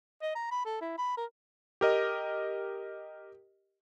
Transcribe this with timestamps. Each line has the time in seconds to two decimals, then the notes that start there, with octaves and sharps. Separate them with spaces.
0.22 D#5
0.35 A#5
0.51 B5
0.65 A4
0.81 E4
0.98 B5
1.17 A#4
1.81 G4 A#4 D#5